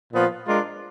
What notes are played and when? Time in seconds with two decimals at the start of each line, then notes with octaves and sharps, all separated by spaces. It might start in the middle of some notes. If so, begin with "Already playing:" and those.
0.12 A#2 F3 B3 F4
0.47 G#3 D4 F4 A#4